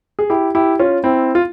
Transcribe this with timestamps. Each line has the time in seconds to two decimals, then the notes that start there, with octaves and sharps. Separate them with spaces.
0.19 G#4
0.30 E4 G4
0.55 E4 G4
0.79 C#4 F4
1.04 C4 E4
1.35 F4